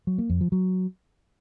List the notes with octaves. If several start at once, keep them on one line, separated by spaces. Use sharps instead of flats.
F#3
A#3
F2
F3
F#3